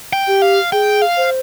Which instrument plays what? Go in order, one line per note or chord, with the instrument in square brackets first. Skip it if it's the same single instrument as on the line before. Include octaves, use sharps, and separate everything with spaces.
[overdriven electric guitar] G5
[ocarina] G4
[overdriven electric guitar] F5
[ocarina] G#4 [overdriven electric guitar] G5
[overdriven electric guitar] F5
[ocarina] C5